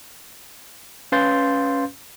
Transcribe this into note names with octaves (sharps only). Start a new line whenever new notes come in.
C#4 B4 F5 C6 G6 A6